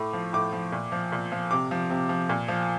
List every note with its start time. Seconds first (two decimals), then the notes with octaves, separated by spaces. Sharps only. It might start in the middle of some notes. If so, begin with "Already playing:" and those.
Already playing: A2 D6
0.13 F3
0.33 A2 D6
0.52 F3
0.72 A#2
0.92 F3
1.12 A#2
1.32 F3
1.51 C3 D6
1.71 F3
1.90 C3
2.09 F3
2.29 A#2
2.48 F3